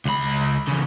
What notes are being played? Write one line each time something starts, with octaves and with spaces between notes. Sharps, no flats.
C#2 B5
E2 C#3